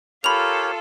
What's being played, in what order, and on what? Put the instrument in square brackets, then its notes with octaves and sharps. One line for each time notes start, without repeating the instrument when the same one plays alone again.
[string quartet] F4 A4 F5 [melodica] G4 A#4 C#5 [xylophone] B5 F7